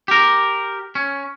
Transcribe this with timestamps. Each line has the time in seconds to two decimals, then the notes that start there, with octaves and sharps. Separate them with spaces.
0.08 G4 A#4
0.95 C#4